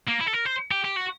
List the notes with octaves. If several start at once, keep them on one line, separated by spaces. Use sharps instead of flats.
A#3
E4
A4
A#4
C5
G4
G4
F#4